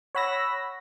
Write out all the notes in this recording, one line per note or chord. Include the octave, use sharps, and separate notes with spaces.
C#5 F#5 B5 E6 A#6